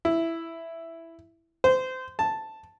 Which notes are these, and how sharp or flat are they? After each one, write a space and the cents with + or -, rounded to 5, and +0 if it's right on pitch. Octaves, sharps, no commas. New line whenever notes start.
E4 +5
C5 -25
A5 +0